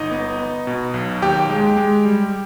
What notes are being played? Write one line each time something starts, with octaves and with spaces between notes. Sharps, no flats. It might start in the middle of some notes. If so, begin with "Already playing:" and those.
Already playing: G1 D#4 D#5
B3
B3
B2
B1
D#2 G4 G5
G#3
G#3
G3